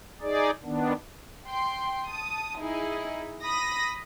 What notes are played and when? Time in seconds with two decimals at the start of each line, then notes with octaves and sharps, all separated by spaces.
0.21 D#4 G#4 D5
0.64 D#3 B3 D4
1.48 G5 C6
2.07 A5 D#6
2.57 D#4 E4 G#4
3.43 B5 D#6 A#6